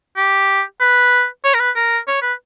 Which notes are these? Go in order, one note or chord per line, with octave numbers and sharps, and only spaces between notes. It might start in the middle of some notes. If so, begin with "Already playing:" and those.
G4
B4
C#5
A#4
B4
A#4
C#5
B4